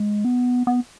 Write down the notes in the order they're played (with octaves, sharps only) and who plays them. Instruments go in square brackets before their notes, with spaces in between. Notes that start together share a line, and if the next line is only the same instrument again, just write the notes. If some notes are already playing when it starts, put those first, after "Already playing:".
Already playing: [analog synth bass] G#3
B3
B3